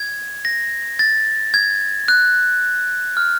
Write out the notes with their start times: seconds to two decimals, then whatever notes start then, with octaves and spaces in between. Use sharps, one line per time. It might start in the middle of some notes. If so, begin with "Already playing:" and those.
Already playing: G#6
0.45 A#6
0.99 A6
1.54 G#6
2.08 F#6
3.17 F6